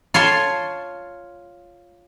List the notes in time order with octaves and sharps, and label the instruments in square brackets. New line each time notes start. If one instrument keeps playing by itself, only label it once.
[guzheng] F4 C#5 A5 C6